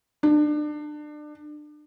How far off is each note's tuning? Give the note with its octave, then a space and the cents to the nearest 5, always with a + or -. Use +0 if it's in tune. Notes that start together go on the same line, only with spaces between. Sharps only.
D4 +30